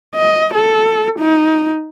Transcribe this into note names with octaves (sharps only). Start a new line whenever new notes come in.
D#5
A4
D#4